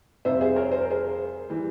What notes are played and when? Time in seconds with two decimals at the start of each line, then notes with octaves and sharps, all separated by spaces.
0.25 F2 C3 G3 C5 E5
0.41 G#4 C5
0.56 A#4 C#5
0.72 C5
0.81 A#4
0.90 G#4 C5
1.49 E3 G3